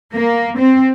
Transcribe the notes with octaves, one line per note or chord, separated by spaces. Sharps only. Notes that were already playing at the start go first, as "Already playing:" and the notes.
A#3
C4